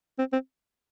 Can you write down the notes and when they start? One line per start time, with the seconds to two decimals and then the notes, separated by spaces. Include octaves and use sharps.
0.19 C4
0.33 C4